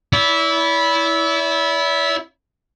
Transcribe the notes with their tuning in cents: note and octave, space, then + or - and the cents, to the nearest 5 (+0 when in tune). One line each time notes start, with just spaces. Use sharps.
E4 -10 D5 -45